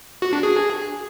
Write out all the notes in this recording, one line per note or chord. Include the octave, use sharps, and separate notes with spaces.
F#4
D4
G#4